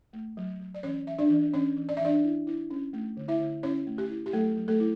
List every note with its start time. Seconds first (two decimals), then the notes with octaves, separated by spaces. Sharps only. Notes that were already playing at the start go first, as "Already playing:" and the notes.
0.13 A3
0.37 F#3
0.60 F#3
0.74 D5
0.83 E3 C#4 C#5
1.07 E3 E5
1.19 D4 D5
1.30 E3
1.53 E3 C#4 C#5
1.77 E3
1.89 D5
1.97 E5
2.00 E3 D4 D5
2.24 E4
2.47 E4
2.70 C#4
2.93 A3
3.17 D3
3.28 E4 E5
3.40 D3
3.63 C#4 E4 C#5
3.87 A3
3.98 G4
4.10 E4
4.26 G4
4.33 F#3 A3 A4
4.57 F#3
4.68 A3 A4
4.80 E4